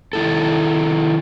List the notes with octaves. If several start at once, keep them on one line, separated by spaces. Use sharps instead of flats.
D#3 E4 A4